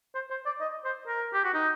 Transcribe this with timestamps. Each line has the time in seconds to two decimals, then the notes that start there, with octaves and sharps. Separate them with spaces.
0.15 C5
0.30 C5
0.46 D5
0.61 D#5
0.85 C5
1.07 A#4
1.34 G4
1.44 F#4
1.54 D#4